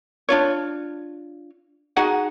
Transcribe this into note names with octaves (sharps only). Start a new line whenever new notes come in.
D4 F4 C#5
D#4 F#4 G#4 F#5